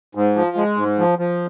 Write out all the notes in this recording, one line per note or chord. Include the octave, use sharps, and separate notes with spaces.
G#2
F3
G#3
G#2
F3
F3